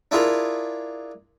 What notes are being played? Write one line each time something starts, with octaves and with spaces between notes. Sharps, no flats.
D4 E4 F4 G#4 A#4